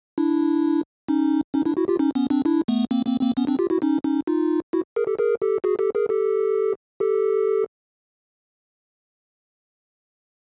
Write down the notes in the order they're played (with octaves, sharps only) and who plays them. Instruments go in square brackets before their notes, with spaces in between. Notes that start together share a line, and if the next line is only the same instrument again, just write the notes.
[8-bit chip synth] D4 E4
C#4 D#4
C#4 D#4
D4 E4
E4 F#4
F4 G4
C#4 D#4
B3 C#4
C4 D4
D4 E4
A3 B3
A#3 C4
A#3 C4
A#3 C4
B3 C#4
C4 D4
F4 G4
E4 F#4
C#4 D#4
C#4 D#4
D#4 F4
E4 F#4
G#4 A#4
G4 A4
G#4 A#4
G4 A4
F#4 G#4
G4 A4
G#4 A#4
G4 A4
G4 A4